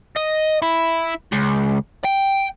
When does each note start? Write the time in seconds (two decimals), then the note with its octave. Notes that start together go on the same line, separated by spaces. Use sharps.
0.17 D#5
0.62 E4
1.32 C#2
2.04 G5